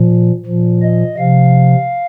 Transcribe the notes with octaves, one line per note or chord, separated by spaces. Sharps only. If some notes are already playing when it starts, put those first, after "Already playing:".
Already playing: A#2 F3
A#2 F3
D#5
C3 F3 F5